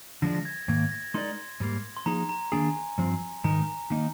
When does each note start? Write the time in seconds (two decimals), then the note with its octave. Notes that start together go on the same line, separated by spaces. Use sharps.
0.22 D3 F3 G#3 D4 A#6
0.35 A#6
0.45 G#6
0.68 G#2 D#3 A#3 G#6
0.92 A#6
1.14 G#3 D#4 A#4 D5 C6
1.60 G#2 G3 A#3
1.97 C6
2.06 F3 A#3 D#4 G#4 A#5
2.29 A#5
2.52 D#3 A#3 D4 G#4 G#5
2.98 G2 F3 C4
3.44 G#2 D#3 G#3 D#4 A#4 A#5
3.90 D#3 A#3 D#4